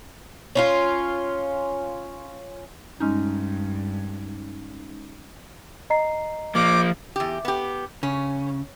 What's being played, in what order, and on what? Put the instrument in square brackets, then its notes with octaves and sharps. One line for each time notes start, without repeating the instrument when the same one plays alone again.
[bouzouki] C#4 D#4 F4
[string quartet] G2 [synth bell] G#3 C#4 D#4
[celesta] D#5 A#5 C7
[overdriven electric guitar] F3 A#3 [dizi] D6
[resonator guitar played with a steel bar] E2 G4
B3 G4
[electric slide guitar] C#3 [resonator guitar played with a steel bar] C#4